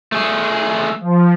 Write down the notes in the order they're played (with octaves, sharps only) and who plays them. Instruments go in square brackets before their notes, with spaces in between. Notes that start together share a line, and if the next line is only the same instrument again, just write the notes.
[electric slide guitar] A3 G#4
[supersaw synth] F3